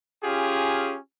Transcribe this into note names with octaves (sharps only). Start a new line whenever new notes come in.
C#4 F4 G4 G#4